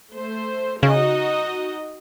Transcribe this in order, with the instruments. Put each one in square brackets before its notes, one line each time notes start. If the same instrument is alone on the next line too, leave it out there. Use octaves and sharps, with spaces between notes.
[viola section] A3 C5
[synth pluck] C#3 [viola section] D#4 F#4 D#5